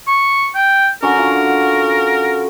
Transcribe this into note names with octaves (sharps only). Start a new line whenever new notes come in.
C#6
G5
D3 F#3 C#4 A#4
F4 F#4